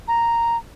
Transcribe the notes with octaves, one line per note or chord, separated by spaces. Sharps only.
A#5